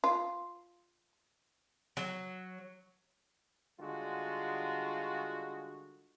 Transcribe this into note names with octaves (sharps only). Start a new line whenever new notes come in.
F4
F#3
D3 G3 G#3 F4 F#4